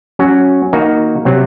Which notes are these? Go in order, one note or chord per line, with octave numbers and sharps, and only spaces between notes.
F#3 C#4 F#4
D#3 A#3 D#4 F#4
C3 F#3 C4